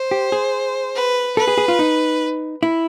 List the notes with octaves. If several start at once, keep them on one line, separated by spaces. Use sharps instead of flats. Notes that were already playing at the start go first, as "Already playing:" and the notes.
Already playing: C5
G4
G#4
B4
A4 B4
G#4
G#4
F4
D#4
E4